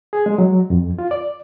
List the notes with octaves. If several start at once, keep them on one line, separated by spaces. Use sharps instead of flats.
G#4
G#3
F#3
F2
F4
D5